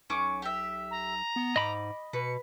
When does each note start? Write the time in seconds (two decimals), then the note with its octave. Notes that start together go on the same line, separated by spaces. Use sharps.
0.10 B1 C#4 C#6 D6
0.42 G4 E5
0.91 A#5
1.36 B3
1.56 G#2 D#5 B5 D6
2.13 B2 B4 C#7